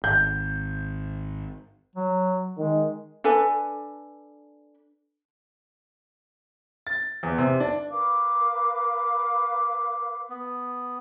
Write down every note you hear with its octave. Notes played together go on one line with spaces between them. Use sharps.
G#1 G6
F#3
D#3 G#3
D4 A4 B4 G#5
A6
E2
C3
D4
A#4 B4 F5 D6
B3